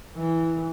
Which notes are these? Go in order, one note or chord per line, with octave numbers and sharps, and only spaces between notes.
E3